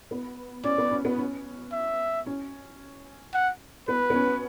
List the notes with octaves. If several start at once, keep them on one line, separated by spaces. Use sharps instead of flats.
B3
C#4 D5
B3
C#4
B3
C#4
E5
C#4
F#5
B3 B4
B3
C#4